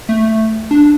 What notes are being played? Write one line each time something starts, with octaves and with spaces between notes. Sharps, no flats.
A3
D4